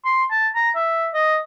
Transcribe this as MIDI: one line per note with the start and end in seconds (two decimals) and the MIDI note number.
0.05 0.25 84
0.31 0.48 81
0.55 0.70 82
0.76 1.07 76
1.14 1.37 75